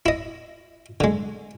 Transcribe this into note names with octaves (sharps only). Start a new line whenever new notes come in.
E4 D#5
D3 G#3